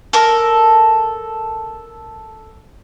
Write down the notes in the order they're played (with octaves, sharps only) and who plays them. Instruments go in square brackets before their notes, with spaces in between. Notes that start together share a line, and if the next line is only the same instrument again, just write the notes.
[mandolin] A4 A#4